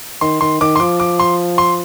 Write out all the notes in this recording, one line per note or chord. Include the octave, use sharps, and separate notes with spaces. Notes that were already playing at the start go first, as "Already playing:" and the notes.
D#3 C6
D#3 C6
D#3 D6
C6
F3 D6
D6
C6
C6